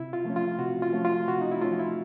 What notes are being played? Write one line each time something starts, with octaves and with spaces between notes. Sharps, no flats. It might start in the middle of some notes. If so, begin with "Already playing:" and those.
Already playing: C3 E4
F4
F3 A3 C#4
F4
C3 F#4
F4
F3 A3 C#4
F4
C3 F#4
D#4
E4
F3 A3 C#4 F4
E4